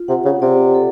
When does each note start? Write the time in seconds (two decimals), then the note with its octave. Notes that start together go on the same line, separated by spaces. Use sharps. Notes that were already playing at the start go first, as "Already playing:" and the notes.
Already playing: F4
0.08 C3 F#5
0.25 C#3
0.42 C3 D5
0.75 A4